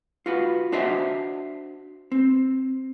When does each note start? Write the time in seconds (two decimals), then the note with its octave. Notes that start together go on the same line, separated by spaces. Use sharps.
0.26 F4 F#4 B4
0.72 D4 F#4 C5 D#5 E5
2.12 C4